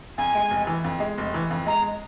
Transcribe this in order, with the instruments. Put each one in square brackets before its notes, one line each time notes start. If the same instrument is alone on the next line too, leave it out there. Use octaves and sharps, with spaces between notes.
[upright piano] F2 [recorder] G#5
[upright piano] G#3
F1
E3
F2
G#3
F1
E3
F2
[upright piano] G#3 [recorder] A#5